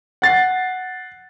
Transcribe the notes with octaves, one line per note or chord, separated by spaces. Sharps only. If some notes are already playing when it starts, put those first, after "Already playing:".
F#5 A6 C7